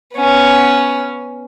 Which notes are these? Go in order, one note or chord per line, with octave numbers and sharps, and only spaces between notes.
B3 C#4